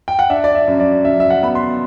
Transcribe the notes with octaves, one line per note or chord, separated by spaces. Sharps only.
G5
F#5
D4 E5
D5
E5
F#2
D5
F#2 E5
E5
F#5
B3 B5
C6